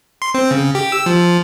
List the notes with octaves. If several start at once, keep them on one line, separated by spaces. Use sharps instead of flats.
C6
C4
C#3
G4
E6
F3